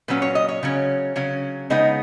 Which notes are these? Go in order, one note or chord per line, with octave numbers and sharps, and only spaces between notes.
A#2 F#3 C#4 B4
C#5
D#5
C#5
C#3 F#3 C#4
C#3 F#3 C#4
C#3 G#3 B3 D#4 D#5